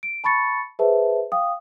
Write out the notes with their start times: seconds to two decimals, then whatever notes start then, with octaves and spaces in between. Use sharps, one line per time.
0.03 D7
0.24 A5 B5 C#6 A6 C#7
0.79 G#4 B4 C5 E5 A5
1.32 F5 G5 D#6